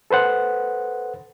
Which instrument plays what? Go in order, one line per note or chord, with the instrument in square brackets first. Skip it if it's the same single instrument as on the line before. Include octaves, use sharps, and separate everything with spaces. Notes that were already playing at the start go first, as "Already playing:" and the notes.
[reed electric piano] A4 B4 C5 F#5